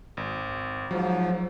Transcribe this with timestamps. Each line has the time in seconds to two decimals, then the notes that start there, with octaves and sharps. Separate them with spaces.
0.17 G#1
0.91 G#2 F3 F#3